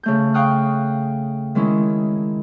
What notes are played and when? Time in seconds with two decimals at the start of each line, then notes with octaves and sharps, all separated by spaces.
0.03 C#3 A3 G6
0.34 F5 G5 C#6 D#6 F6 F#6
1.55 D#3 G#3 C#4 E4